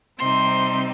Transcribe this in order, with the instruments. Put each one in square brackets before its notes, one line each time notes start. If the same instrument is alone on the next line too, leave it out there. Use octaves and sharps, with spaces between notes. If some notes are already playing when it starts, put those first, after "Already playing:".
[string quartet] C3 G3 C4 D#4 C6